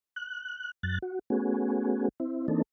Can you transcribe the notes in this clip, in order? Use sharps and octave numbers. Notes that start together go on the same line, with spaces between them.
F#6
F#2 F#6 A6
F#4
A3 B3 C#4 F#4 G#4
C4 E4
E3 A#3 C4 D4 D#4 A4